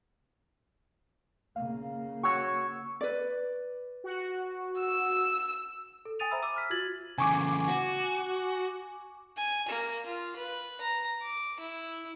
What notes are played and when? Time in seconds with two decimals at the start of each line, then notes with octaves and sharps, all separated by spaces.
1.56 C#3 A#3 F5
2.23 F#4 C#5 C#6 E6 G#6
3.01 B4 D5
4.04 F#4
4.80 E6
6.05 A4
6.19 G5 G#5 D#6 A6 D#7 F7
6.31 C5 E5 A#5 B5 E6
6.42 D6 E6 D#7
6.56 F6 B6
6.70 F4 F#4 G#6 A6 F#7
7.18 C#3 E3 G#5 C#6 D6
7.68 F#4
9.37 G#5
9.68 A#3
10.06 F4
10.36 B4
10.81 A#5
11.22 D6
11.60 E4